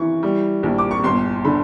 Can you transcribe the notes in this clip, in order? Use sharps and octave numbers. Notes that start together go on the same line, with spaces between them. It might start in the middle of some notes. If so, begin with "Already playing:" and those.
Already playing: E3 C#6
G3
A#1
D6
C#6
G1 C6
D3 B5